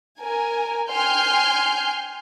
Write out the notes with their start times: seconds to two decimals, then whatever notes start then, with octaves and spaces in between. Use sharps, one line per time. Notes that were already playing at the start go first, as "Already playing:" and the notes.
0.20 A#4 G#5
0.90 G5 G#5 C6 F6 G6